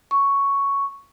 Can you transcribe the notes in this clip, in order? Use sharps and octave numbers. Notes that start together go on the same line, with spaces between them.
C#6